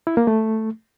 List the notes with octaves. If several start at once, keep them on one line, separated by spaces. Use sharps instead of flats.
E4
A#3
A3